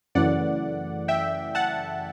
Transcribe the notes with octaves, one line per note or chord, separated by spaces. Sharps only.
F#2 C#3 E3 A3 D5 F#5
E5 G5
F#5 A5